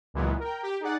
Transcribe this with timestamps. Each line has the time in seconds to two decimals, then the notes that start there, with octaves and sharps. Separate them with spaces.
0.14 C#2 A#2 E3 F#3 G#3 B3
0.40 A#4 G5
0.63 G4
0.80 D#4 G#4 D5 F#5